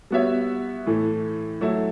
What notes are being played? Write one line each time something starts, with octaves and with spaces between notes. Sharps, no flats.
G3 B3 F#4 C#5 E5
A2 E3 A3
F#3 A3 E4